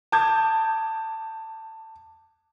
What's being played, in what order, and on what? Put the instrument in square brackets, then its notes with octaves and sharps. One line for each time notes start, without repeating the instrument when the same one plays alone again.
[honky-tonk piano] A5 D6 D#6 G6 G#6